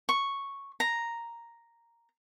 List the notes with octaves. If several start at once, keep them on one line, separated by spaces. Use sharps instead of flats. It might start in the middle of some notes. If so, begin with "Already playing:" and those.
C#6
A#5